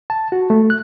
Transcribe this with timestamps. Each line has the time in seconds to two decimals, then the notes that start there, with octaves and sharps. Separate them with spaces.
0.10 A5
0.32 F#4
0.50 A3
0.70 F#6